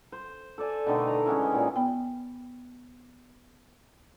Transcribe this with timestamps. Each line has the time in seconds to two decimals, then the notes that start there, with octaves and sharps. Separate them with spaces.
0.12 C5
0.58 A4 D5 G#5
0.87 B2 D3 D#3 A3
1.07 A#5
1.26 G#3 B3 C#4 E4
1.52 A#2 D#3
1.76 B3 G5